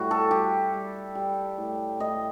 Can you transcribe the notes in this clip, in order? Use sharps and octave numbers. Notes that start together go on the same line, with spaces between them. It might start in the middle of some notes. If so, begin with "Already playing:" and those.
Already playing: A2 G3 F#4
A4
G3 G4
G3
G3
A2
A2 D#5